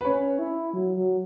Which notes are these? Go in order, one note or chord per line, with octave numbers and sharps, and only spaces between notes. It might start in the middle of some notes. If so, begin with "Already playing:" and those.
B4
C#4 C#5
E4
F#3
F#3